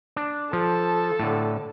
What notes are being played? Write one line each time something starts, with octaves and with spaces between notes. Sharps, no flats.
D4
F3 A4
A2 D3